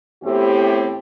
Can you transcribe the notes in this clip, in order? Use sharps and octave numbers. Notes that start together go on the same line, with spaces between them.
E2 A2 C4 E4 G4